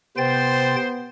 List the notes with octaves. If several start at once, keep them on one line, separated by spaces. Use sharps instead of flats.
C3 B3 C5 G5 A6